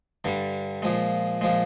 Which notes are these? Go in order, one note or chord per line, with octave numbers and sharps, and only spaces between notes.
G2 D3 G3
A#2 F3 G#3
A#2 F3 G#3